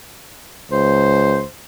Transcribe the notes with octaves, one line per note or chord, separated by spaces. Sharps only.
C#2 C5